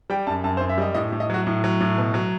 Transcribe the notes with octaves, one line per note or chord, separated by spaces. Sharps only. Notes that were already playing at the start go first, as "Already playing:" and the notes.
G3 G5
F#2 A5
F#2 A5
C5
F#2
E5
G3 D#5
A2 D#5
A2
D#5
F#3 F#4
A2
F#3
A2
B2
F#3